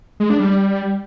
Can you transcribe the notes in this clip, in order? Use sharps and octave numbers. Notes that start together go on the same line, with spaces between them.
G#3
D4
G3